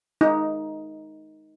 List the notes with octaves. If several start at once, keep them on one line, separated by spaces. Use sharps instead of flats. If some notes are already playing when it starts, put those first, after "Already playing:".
D#4